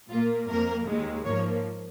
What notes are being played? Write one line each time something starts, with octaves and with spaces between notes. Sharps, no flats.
A#2 A#3 F4
F2 F3 A#3 A#4
D#2 D#3 G#3
G#2 F3 A#3 C#5